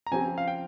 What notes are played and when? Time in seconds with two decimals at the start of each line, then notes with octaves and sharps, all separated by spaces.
0.07 A#5
0.11 C#3 F3 C4 G4 G#5
0.38 F5
0.48 G5